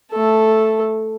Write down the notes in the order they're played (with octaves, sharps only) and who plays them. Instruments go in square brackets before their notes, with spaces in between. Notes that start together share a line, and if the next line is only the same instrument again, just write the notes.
[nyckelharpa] A3 A4